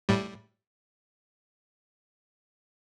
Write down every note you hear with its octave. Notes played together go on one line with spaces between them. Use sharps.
A2 G3